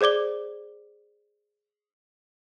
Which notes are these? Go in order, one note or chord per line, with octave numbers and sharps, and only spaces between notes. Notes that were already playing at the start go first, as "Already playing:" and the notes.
G#4 C5 D5 D6 G7